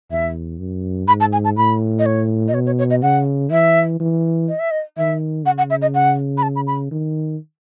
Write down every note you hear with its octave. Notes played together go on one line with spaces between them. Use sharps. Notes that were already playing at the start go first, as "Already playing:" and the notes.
E2 E5
F#2
G#2 B5
A5
G#5
A5
A2 B5
D#5
C#5
D#5
B2 C#5
C#5
C#5
D#5
C#3 F#5
E3 E5
E3
D#5
E5
D#5
D#3 E5
C#3 F#5
F#5
E5
D#5
F#5
B5
A5
B5
B5
D#3